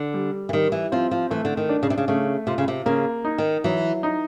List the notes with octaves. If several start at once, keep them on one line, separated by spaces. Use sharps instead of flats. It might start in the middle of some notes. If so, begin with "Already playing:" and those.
Already playing: D3
G3
E3
D#3 G3
E3
F3 C4
F3
E3 A3
D3
D#3
D4
C#3
C3
C#3
C#3 A3
C3 F4
C#3
C3
C#3 A#3
D#4
D#3
E3 F#3
D#4